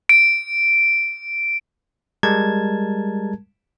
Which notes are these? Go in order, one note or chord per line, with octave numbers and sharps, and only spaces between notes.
D7
G3 G#3 A#4 A5 G#6